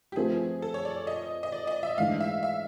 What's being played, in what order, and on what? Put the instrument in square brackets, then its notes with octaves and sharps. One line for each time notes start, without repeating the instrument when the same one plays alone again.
[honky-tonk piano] G4
[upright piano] F3 A3 C4 [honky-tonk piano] G#4
[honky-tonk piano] A4
C#5
D5
D#5
D#5
D5
D#5
E5
[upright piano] G#2 E3 A3 D4 [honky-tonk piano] F5
[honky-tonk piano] E5
E5